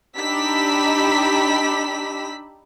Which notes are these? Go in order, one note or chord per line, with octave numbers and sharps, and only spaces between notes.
D4 D#4 G4 B5 E6 B6